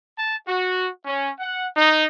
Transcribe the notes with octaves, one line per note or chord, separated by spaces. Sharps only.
A5
F#4
C#4
F#5
D#4